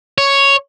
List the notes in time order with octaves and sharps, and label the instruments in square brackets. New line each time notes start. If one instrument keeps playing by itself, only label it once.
[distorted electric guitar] C#5